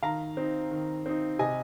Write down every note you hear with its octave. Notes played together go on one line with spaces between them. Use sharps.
D#3 F5 A#5
C4 D#4
D#3
C4 D#4
C3 D#5 G#5